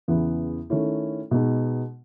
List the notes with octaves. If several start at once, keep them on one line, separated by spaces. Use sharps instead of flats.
E2 C#3 E3 B3 E4
D#3 A3 C#4 E4
B2 G#3 B3 D#4